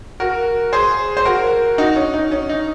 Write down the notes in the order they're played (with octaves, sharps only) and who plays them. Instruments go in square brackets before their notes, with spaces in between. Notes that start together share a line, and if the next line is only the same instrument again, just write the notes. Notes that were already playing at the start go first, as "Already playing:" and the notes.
[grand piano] F#4 A#4
G#4 C5
C5
F#4 A#4
D#4 F#4
C#4
D#4
C#4
D#4